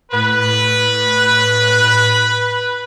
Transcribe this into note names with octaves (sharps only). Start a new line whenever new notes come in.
A2 B4